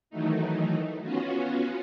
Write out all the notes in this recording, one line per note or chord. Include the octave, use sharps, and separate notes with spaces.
D#3 E3 F#3 A3 D#4
B3 C#4 F4 F#4